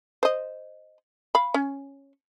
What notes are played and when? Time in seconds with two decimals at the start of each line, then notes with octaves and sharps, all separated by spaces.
0.23 C5 D#5
1.35 F5 B5
1.54 C#4